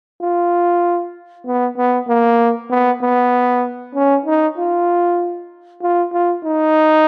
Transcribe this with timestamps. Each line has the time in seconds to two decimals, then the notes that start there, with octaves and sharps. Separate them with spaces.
0.21 F4
1.46 B3
1.77 B3
2.08 A#3
2.70 B3
3.01 B3
3.94 C#4
4.26 D#4
4.57 F4
5.82 F4
6.13 F4
6.43 D#4